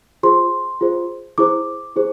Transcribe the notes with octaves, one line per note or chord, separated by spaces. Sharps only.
F4 G#4 C5 C6
F4 G#4 C5
E4 G#4 C5 D6
E4 G#4 C5